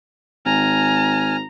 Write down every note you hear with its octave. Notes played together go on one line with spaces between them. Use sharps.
G#1 G#5 A#5 F6